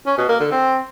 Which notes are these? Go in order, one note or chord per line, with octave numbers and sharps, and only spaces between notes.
C#4
B2
A#3
D3
C4